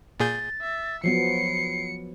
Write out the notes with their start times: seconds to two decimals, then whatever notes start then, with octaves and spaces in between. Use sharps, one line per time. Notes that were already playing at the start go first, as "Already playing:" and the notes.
0.20 A#2 G#4 G6 A6
0.61 E5
1.04 F3 F#3 B3 C7 C#7